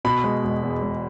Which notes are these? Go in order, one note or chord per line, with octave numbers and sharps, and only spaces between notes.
B2 B5
G#3
E1
E2
E1